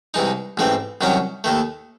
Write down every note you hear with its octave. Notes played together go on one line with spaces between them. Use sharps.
C2 C3 E3 G#3 D#4
A1 G#2 E3 A3 C4
C2 C3 D#3 F#3 C#4
D#2 D#3 A3